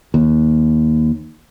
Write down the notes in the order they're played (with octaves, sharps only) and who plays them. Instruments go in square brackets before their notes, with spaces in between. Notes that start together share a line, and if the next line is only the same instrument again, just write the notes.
[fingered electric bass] D#2